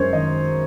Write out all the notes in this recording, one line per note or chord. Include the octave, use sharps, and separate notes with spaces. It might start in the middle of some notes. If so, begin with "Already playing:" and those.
Already playing: F#2 G#3 C#4 A#4 C5 C#5
D#3 D#5